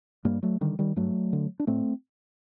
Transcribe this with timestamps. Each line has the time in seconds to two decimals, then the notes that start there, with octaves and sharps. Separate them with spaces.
0.25 G2 G3 A#3
0.43 F#3 A3
0.61 D3 D#3 G3
0.79 D#3 G3
0.96 G2 F#3 A3
1.33 D3
1.60 D4
1.67 A2 A3 C4